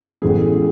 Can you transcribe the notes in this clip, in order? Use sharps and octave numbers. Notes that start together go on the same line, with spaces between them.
A1 A2 E3 G#3 B3 G#4